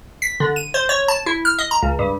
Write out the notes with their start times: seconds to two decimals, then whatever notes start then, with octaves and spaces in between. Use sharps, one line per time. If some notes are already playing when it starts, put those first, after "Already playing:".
0.22 B6
0.40 D3
0.56 D#7
0.74 C5
0.89 C#5
1.08 A5
1.26 E4
1.45 F6
1.59 D#5
1.71 A#5
1.83 C#2
1.99 G2